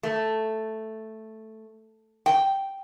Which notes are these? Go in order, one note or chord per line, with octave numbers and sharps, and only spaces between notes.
A3
G5